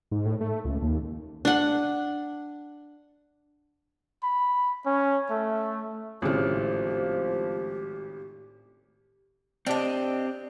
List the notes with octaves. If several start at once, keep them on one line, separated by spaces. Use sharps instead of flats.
G#2
A2
A3
C#2
D#2
D4 F#5
B5
C#4
A3
G#1 A2 C#3 F3 G4 D5
C4 D4 G4 D#5